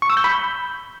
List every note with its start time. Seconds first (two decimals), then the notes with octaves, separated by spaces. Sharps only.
0.02 C#6
0.10 E6
0.17 G6
0.24 B5
0.32 G6